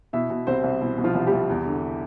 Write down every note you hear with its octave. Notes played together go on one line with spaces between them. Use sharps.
B2 E4 E5
B2
C2 C4 C5
C2
B2 E4
B2
F3 F4
C2
G3 G4
C2
E2
D3